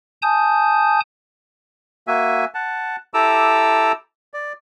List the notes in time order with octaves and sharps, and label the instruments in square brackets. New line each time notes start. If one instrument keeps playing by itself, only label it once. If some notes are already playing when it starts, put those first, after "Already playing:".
[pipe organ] G#5 A5 D#6 G6
[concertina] A#3 F#4 E5 G#5
F#5 A5
E4 G4 A4 A#5 D6 E6
D5